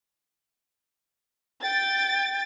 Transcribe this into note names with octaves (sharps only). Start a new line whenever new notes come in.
G5 A6